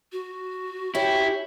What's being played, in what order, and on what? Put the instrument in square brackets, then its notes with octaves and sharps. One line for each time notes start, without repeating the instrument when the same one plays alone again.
[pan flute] F#4
[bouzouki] C#4 G4 [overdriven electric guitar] E4